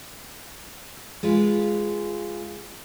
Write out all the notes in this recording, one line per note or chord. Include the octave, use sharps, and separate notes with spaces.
G#3 F4 B4